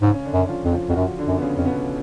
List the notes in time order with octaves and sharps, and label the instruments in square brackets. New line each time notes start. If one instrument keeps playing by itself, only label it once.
[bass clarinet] G#2 [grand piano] C#3 C#4
[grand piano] C#4
D3 D4
[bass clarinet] F#2
[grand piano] F3 F4
[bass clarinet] F2
[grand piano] F3 F4
[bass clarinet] F2 [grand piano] F#4
[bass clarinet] F#2 [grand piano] F3 F4
[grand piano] D3 D4
[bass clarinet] F#2
[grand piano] B3
C#3 C#4
[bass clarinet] F2 [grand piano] C#4
[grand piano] B2 B3